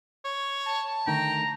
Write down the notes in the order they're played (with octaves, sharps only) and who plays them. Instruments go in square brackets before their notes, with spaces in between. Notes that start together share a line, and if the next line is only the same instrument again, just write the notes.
[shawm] C#5
[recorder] A5
[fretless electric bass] D3 D#3 A3 [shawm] G5 [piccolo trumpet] A#5